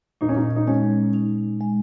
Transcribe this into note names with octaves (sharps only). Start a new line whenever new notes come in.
A#2 D#4
C#4
D#4
D#4
G#3 C#4
D#4
G#3